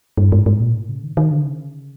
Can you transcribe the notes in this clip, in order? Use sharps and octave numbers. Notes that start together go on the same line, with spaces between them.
G2
G#2
G#2
A#2
A2
C#3
D#3
D#3
D3
C#3